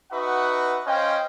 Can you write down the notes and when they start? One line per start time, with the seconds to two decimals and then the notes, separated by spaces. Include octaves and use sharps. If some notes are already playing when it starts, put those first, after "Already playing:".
0.11 D#4 F#4 B4 E5 F#5
0.87 C#4 C5 D#5 F5 G5